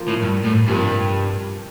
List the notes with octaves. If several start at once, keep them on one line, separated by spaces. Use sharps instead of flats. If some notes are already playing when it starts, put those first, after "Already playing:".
Already playing: F3 A#3 F4
A2
G2
A2
G2 C3 F3 A#3